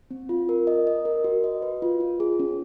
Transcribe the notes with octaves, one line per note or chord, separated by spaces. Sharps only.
C4
F4
A#4
D#5
D#5
A#4
F#4
D#5
B4
F4
F4
G#4
C#4